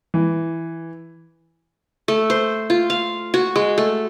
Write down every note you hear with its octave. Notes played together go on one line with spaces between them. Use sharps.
E3
A3
C5
F4
F5
F#4
G#3
A3